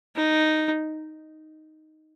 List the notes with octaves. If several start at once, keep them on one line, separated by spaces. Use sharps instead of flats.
D#4